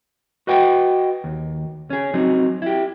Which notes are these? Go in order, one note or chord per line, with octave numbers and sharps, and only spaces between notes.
F#4 B4 D#5 F#5 G5
D#2
C#4 G#4
F#3 C4 D#4
E4 G4